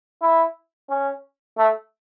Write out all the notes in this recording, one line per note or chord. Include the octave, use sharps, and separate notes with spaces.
E4
C#4
A3